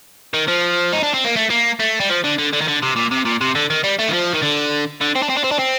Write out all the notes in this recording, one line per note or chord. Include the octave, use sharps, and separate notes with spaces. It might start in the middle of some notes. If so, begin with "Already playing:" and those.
D#3
F3
D#4
D4
C4
A#3
A3
A#3
A3
G3
F3
D3
D3
D3
D#3
D3
C3
A#2
C3
A#2
C3
D3
D#3
G3
A3
D#3
F3
D#3
D3
D3
C4
D4
C4
D4
C4
D4
C4